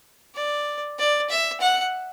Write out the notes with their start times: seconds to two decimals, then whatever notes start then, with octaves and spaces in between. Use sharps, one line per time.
0.35 D5
0.99 D5
1.30 E5
1.61 F#5